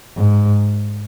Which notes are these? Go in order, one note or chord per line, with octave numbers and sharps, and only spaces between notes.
G#2